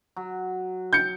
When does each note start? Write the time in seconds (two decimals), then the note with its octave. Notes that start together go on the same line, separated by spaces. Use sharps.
0.16 F#3
0.93 G6 C#7